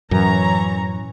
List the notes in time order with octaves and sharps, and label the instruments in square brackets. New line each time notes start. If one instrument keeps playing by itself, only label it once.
[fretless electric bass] F#2 [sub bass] A2 [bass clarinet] E3 [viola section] C#5 A#5